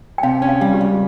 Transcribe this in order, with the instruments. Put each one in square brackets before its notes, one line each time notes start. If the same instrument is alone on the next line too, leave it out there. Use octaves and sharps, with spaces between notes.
[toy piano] G5
[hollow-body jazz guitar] C3 [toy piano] F5
[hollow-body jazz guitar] C#4
[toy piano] F5
[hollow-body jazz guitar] G3
[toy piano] G4
[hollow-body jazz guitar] C#2